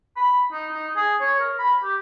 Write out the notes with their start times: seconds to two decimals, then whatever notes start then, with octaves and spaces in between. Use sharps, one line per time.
0.17 B5
0.53 D#4
0.72 D#4
0.96 G#4
1.21 C#5
1.40 A#4
1.59 B5
1.83 G4